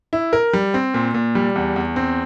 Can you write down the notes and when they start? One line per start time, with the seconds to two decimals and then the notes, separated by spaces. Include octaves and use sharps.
0.13 E4
0.33 A#4
0.53 G3
0.74 C4
0.94 A#2
1.14 A#2
1.35 G3
1.56 E2
1.76 E2
1.96 C4